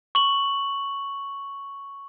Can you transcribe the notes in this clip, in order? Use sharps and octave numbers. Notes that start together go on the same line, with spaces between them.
C#6 F#7